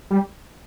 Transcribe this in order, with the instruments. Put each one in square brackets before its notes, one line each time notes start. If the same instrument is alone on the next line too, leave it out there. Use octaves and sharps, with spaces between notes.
[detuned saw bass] G3